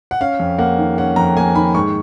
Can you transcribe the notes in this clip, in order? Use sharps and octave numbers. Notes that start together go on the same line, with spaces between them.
F#5
C#4 F5
F2
A#3 F#5
D#3
C#4 F#5
F2 A#5
A#3 G#5
D#3 B5
G#2 C#6